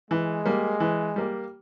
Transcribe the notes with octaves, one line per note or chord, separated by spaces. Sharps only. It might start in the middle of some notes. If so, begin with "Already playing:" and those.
E3 G#3
G3 A#3
E3
G3 A#3